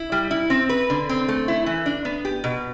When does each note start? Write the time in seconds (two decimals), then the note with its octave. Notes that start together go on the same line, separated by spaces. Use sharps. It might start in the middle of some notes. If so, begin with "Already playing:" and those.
Already playing: E4
0.12 G3
0.31 E4
0.50 C4
0.69 B4
0.90 D3
1.09 C4
1.28 A3
1.48 E4
1.66 E3
1.86 D4
2.05 B3
2.25 G4
2.44 B2